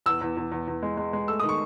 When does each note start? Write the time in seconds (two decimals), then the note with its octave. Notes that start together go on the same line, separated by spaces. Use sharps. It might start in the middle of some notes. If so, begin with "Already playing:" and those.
0.06 E2 E6
0.21 E2
0.37 E2
0.52 E2
0.68 E2
0.83 G#3
0.97 G#3
1.13 G#3
1.28 A3 E6
1.40 D#3 D#6
1.49 C#6